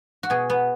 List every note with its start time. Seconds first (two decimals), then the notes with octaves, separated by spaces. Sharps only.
0.23 F#4
0.30 B2 G#4
0.50 B3